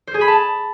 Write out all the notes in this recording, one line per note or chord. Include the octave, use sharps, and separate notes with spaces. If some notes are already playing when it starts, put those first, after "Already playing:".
C5
G#4
B5
A5